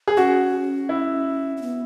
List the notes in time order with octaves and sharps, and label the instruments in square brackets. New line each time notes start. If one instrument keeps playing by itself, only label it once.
[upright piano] G#4
[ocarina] C#4 [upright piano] F#4
[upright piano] E4
[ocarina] C#4
B3